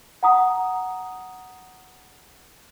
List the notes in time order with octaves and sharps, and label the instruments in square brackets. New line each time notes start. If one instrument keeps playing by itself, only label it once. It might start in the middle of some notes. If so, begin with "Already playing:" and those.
[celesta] F#5 A#5 D#6